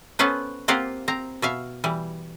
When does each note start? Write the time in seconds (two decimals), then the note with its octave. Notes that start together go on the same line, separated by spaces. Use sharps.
0.19 B3 C#4 A4 B4 C5
0.68 A#3 C4 F4 G4 F5 F#5
1.08 C4 A#5
1.42 B2 E5 F5
1.84 E3 G3